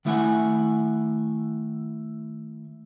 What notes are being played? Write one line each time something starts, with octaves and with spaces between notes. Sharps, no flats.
D#3 A3 E4 D5 F#5 G#5